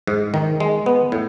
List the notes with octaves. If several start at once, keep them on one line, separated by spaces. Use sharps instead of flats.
G#2
D#3
G#3
B3
A2